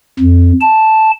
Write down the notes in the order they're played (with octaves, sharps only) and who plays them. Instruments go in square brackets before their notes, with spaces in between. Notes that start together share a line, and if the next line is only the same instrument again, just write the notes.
[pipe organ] F2
A5